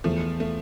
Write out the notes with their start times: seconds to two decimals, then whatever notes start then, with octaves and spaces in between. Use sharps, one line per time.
0.04 E2 F3 A3
0.40 A3